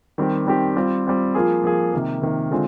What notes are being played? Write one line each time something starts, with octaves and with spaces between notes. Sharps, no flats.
D#3 G3 C4 G4
D#3 G3 C4 G4
G3 C4 F4
G3 C4 F4
F3 A#3 F4 G#4
F3 A#3 F4 G#4
C3 D#3 A#3
C3 D#3 A#3
D3 G#3 C4 F4